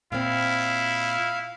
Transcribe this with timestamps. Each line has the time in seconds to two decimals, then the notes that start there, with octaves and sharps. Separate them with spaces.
0.12 A#2 C4 E4 F5